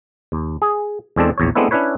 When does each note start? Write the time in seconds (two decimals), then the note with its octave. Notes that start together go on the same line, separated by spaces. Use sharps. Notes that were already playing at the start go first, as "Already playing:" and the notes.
0.32 D#2
0.62 G#4
1.16 E2 G#3 C4 D4 A4
1.38 A#1 E2 C#5
1.55 G#3 A3 B3 C4 D4 E4
1.71 C#4 D4 E4 B4 C#5